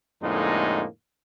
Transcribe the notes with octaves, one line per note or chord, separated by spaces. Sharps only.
F2 A2 D3 G#3 A#3 D#4